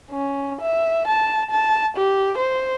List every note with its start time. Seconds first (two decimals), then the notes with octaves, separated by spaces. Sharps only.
0.10 C#4
0.61 E5
1.08 A5
1.51 A5
1.97 G4
2.38 C5